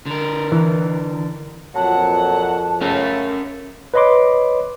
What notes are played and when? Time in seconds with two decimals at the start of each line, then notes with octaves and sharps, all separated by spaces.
0.06 D3 A#4
0.52 E3
1.75 F2 A#2 F#3 F#5 A5
2.81 C#3 A3 C#4 A#4
3.94 B4 C#5 D#5 B5 C6 D6